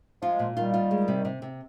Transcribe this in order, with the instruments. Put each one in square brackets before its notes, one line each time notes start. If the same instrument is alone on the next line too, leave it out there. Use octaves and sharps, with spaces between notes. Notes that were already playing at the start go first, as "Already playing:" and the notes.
[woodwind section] F3 G#3 [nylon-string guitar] F4
[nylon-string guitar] A#2
[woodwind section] D#3 G3 [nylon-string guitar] F4
[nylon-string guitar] F4
G#3
C3
C3
C3